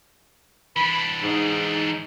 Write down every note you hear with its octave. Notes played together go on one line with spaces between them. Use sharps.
E3 D4 B5
G#2 D#4